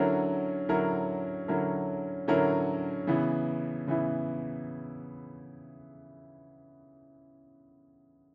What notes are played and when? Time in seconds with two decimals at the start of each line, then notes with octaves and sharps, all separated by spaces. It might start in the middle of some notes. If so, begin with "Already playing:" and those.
Already playing: D3 F#3 C#4 E4 A#4
0.69 D3 F#3 C#4 E4 A#4
1.48 D3 F#3 C#4 E4 A#4
2.28 D3 F#3 C#4 E4 A#4
3.07 C#3 E3 B3 E4
3.87 C#3 E3 B3 E4